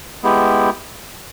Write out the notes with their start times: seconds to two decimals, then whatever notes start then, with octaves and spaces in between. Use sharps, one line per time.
0.23 G#3 B3 E4 G4